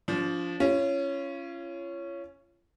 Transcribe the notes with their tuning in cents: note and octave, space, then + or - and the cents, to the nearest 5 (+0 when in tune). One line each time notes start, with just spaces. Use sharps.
F3 +0 D4 -35
C#4 +0 F4 -35